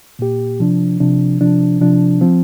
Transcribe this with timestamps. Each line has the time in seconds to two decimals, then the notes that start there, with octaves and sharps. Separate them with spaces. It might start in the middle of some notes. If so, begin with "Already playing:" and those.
0.19 A#2 A#3 G4
0.60 C3 F3 D4
1.00 C3 F3 D4
1.41 C3 F3 D4
1.80 C3 F3 D4
2.21 F3 C4